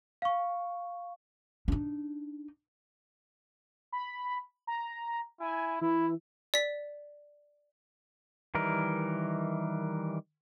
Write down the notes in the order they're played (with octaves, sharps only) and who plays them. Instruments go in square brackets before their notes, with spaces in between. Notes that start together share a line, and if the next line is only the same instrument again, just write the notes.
[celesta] F5 C#6
[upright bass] D4 D#4
[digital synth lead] B5
A#5
[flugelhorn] E4 [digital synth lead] G#5
[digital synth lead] E3 [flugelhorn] E4
[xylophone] D5 B6
[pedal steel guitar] D#3 E3 G3 A#4